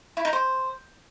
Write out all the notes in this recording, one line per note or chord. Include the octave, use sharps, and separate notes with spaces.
E4
D#4
C5